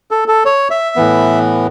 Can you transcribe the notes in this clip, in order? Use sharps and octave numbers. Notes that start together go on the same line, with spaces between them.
A4
A4
C#5
E5
A2 E3 B3